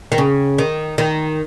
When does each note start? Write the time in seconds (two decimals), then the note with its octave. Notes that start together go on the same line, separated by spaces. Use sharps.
0.12 D#3
0.18 C#3
0.58 D#3
0.98 D#3